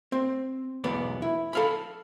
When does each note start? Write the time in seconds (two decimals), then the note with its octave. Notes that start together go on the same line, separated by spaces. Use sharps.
0.12 C4
0.84 B1 E2 B3 D5
1.22 E4
1.53 A4 F5 B5